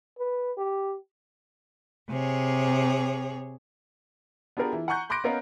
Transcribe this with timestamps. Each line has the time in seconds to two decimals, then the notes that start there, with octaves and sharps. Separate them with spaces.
0.19 B4
0.57 G4
2.10 C3 G#4 C#5
4.57 B3 D4 F4 G4 G#4 A#4
4.73 E3
4.88 F#5 G#5 A#5 C#6 F#6 G6
5.10 B5 C6 D6 F#6 A#6 D7
5.24 B3 C#4 A#4 D#5 F5